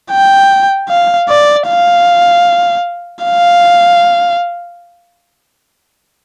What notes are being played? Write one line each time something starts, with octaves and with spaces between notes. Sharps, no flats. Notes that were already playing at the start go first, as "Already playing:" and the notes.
G5
F5
D5
F5
F5